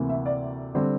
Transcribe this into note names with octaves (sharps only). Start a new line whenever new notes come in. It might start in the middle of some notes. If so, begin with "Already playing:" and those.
Already playing: D2 C3 E3 A#3
E5
D5
D3 G3 C4